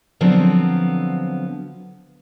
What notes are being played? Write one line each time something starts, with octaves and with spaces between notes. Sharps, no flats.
D3 F3 F#3 B3 C4